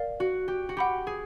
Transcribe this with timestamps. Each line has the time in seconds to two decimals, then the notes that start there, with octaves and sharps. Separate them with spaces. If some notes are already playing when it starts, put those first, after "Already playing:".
Already playing: A#4 D5 F5
0.20 F#4
0.48 G4
0.69 F#4
0.77 G4 F#5 B5 D6
1.07 G#4